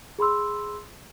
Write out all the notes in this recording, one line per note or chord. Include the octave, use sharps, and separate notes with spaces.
G#4 B5 C6 E6